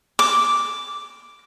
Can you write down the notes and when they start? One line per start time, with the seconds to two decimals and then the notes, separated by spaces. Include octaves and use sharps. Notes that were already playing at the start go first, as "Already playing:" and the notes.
0.19 D6